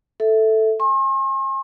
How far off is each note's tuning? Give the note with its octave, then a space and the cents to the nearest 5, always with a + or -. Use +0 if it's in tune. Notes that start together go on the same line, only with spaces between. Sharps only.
A4 +0 E5 -10
G#5 +0 C6 +45